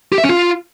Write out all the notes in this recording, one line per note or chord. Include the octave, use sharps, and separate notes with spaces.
G4
E5
C#4
F4